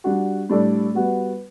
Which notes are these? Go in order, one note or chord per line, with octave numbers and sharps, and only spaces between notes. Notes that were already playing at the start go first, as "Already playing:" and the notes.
G3 D4 F#4
A2 G3 D4 A4 D5
G3 B3 F#4